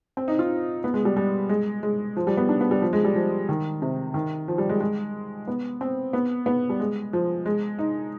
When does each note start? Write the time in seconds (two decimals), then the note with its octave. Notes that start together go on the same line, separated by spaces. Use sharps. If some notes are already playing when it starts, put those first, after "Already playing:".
0.17 C4
0.28 D#4
0.39 F4
0.84 B3
0.94 G#3
1.05 G3
1.16 G3
1.49 G#3
1.83 G#3
2.16 F3
2.27 G3
2.37 B3
2.49 D4
2.61 B3
2.71 G3
2.82 F3
2.93 G#3
3.05 G3
3.16 F3
3.49 D#3
3.82 C3
4.14 D#3
4.48 F3
4.58 G3
4.69 G#3
4.81 G#3
5.47 B3
5.81 C4
6.13 B3
6.46 B3
6.69 G3
6.80 G#3
7.13 F3
7.46 G#3
7.79 D#4